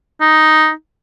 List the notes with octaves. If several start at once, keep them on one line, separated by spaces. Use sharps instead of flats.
D#4